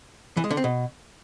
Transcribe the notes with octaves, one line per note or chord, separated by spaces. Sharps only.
E3
G#3
D3
C4
B2